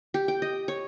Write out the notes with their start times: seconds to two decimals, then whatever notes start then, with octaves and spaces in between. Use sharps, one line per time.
0.14 G4
0.28 G5
0.42 D#5
0.68 C#5